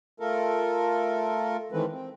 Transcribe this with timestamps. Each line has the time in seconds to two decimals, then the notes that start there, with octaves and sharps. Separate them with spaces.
0.20 A3 F4 A4 A#4
1.72 D#3 E3 G#3 A3 C4 B4
1.92 C4